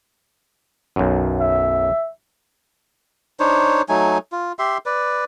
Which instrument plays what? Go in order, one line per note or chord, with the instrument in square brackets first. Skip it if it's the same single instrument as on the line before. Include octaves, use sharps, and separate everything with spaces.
[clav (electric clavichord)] B1 F#2
[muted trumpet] E5
[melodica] D4 D#4 C5 C#5
F#3 A3 D#4 G#5
F4
G4 E5 C6
B4 D5